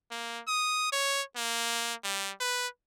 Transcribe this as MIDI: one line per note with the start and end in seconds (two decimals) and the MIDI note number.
0.11 0.41 58
0.48 0.91 87
0.92 1.22 73
1.36 1.94 58
2.04 2.32 55
2.41 2.67 71